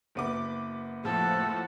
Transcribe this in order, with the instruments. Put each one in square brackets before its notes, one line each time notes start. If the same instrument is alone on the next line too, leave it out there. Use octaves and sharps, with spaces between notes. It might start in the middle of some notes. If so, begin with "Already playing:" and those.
[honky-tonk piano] F#1 B3 D6
[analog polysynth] A2 F3 [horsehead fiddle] A4 F#5